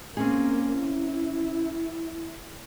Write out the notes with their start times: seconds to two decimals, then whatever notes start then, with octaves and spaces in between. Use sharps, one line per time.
0.17 A#3 C4 C#4 G#4
0.80 E4